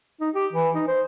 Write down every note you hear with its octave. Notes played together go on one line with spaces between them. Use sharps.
D#4
G4
E3
D#4
C5